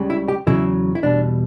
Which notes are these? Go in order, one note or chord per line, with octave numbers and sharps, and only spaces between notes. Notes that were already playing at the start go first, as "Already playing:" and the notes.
Already playing: C#2 C#3 G3
E4
G4
E2 C#3 F#3 E4
E4
E2 B2 G3 D4